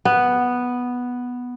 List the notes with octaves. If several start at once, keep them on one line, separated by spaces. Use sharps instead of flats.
B3